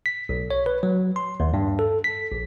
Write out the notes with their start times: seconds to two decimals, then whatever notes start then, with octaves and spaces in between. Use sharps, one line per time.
0.06 B6
0.29 B1
0.51 C#5
0.66 B4
0.83 F#3
1.16 C6
1.40 D#2
1.54 G2
1.79 A4
2.04 B6
2.32 A#1